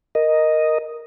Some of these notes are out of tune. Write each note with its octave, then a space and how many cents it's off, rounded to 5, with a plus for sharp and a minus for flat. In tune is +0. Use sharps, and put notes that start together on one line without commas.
A#4 +0 D#5 +0